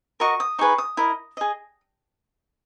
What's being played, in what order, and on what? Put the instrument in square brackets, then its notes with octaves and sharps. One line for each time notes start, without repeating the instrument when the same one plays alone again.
[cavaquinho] F#4 A#4 D#5 C#6
D#6
D#4 G#4 B4 C#6
D#6
E4 A#4 D#5
G#4 D#5